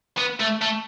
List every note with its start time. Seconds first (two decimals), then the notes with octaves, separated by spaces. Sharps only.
0.18 B3
0.40 A3
0.61 A3